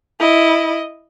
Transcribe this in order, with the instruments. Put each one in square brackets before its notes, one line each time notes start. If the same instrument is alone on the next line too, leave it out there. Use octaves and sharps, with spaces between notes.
[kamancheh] E4 D#5